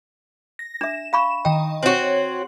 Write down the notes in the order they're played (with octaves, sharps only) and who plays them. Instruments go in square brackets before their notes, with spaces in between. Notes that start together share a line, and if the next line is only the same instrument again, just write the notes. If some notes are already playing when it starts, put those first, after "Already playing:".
[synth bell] A#6
[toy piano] D4 E5 [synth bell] E7
[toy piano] F5 B5 C#6
[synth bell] D#3 D#5 [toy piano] G5
[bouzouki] C4 F#4 [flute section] C#5 [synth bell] F#7